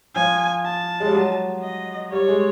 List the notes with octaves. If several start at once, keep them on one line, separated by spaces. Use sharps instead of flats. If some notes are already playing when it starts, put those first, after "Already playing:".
F3 G#5
A5
G#3
G3
F#3
D#5
G3 C#5
G#3